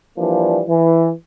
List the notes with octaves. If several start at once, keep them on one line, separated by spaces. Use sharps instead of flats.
E3 F3 G3 A#3 D4
E3